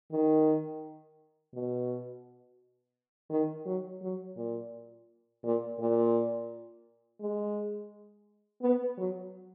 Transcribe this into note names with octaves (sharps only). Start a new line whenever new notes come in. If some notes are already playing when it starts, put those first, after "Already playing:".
D#3
B2
D#3
F#3
F#3
A#2
A#2
A#2
G#3
B3
F#3